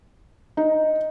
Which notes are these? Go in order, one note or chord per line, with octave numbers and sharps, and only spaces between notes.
D#4